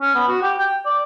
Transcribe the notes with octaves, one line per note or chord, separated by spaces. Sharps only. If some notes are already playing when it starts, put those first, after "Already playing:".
C#4
B3
F#4
G4
G5
D5